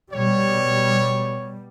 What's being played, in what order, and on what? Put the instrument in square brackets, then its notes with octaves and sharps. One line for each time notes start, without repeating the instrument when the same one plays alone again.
[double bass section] B2 G3 [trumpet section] C#5